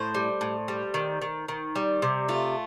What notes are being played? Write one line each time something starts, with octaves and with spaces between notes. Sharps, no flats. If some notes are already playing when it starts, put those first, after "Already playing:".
Already playing: A2 C5
G3
A2
G3
D#3
D#3
D#3
G3
C3
A3 F4